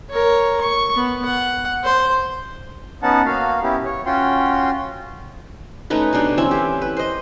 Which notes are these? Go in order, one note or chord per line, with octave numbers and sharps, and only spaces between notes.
A#4 C#5
C#6
B3
F#5
C5
B3 C#4 D#4 F#5 A5
A#3 F#4 F5
B3 C#4 E4 G4
C#5
C#4 F4 F#4 G5 C6
A3 C#4 D#4 B4
B2 A3 D4 G4
E3 C4 C#4 E5
G4
B4
C5 D#5